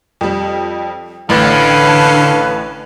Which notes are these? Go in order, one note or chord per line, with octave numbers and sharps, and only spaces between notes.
F2 G3
A1 A2 D3 C#4 A4 B4 F5 A6